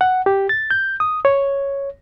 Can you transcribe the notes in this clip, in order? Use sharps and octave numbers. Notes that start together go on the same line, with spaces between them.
F#5
G4
A6
G6
D#6
C#5